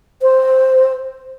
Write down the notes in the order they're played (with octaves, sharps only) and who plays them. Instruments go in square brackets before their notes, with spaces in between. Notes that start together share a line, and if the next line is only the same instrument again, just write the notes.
[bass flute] C5